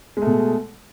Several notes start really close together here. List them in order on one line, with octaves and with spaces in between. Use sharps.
G#3 A3 B2